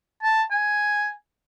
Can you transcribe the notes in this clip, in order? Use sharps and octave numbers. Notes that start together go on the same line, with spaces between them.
A5
G#5